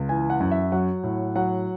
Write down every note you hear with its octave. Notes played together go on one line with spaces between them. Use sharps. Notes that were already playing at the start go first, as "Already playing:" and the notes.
Already playing: C#2
E3 G#5
F#5
F#2
E5
F#3 F#5
A2
F#3 F#5